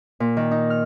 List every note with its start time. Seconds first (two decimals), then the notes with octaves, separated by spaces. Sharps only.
0.20 A#2
0.37 D#3
0.51 D#4
0.70 F6